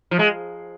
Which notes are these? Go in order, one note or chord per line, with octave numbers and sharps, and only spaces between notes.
F3
G#3